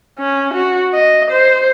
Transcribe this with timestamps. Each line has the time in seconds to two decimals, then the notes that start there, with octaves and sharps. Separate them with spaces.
0.19 C#4
0.54 F#4
0.94 D#5
1.31 C5